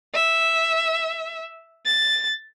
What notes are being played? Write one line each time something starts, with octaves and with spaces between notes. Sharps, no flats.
E5
A6